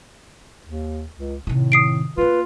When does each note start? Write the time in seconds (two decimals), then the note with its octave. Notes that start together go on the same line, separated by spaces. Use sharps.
0.67 D#2
1.17 C#2
1.47 A2 C3 D#3
1.72 D#6 C7 D7
2.18 A3 A#3 F4 B4